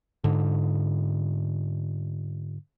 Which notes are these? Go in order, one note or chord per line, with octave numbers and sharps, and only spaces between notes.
G#2 D3